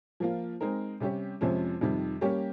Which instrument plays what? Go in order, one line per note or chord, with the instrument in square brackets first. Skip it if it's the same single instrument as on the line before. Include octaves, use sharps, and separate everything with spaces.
[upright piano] F3 A#3 F4
G#3 C4 D#4 A#4
C3 G3 C#4 G4 C#5
F2 C3 F3 G#3 C#4
F2 C3 D#3 G3
G3 A#3 C#4 G4 C#5